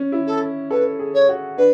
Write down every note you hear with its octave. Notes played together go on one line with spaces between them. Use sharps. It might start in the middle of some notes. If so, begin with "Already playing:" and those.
Already playing: C#4
E4
A4
A4 B4
G#4
C#5
F#4
D4 B4